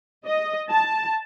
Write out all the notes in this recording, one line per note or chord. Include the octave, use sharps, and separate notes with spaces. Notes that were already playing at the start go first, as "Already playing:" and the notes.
D#5
A5